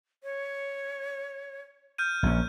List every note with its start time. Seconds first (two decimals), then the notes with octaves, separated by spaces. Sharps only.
0.23 C#5
1.98 F6 G6 D#7
2.23 A#1 A#2 C#4